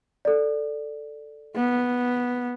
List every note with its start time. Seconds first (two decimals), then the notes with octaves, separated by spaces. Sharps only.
0.25 A4 D5
1.55 B3